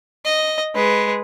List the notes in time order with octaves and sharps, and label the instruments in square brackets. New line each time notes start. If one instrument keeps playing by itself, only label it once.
[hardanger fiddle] D#5
G#3 B4